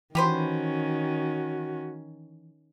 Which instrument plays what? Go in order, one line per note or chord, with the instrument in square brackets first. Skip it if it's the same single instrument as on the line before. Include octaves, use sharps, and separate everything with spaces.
[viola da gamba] D#3 C#4 [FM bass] E3 [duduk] F#4 [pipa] G4 B4 C5